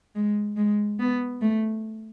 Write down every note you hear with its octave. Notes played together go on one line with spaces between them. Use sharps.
G#3
G#3
B3
A3